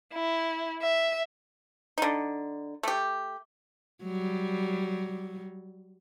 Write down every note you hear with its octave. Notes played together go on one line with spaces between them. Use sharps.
E4
E5
D3 D#4
A3 G4
F#3 G3